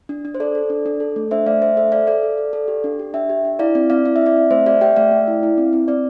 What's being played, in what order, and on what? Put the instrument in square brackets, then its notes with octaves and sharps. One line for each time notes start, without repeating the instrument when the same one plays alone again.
[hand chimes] D4
D4
C5
A4 D5
A4
D4
D4
A4
A3
D4 C5 E5
A3 D5 F5
A3 C5 E5
A4 C5 E5
A4 D5 F5
A4 D5 F5
A4
A4
A4
G4
D4
G4
D4 E5 G5
G4
D4
E4 D5 F5
C4 D5
C4 D5 F5
E4 F5
E5
C4
D5 F5
C4
A3 C5 E5
G4 D5 F5
G4 E5 G5
A3 D5 F5
A3
E4
E4
C4
C4
C4 D5